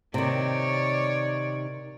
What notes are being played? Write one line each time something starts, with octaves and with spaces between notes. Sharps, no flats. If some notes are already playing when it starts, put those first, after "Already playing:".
C3 D#3 C#5 D5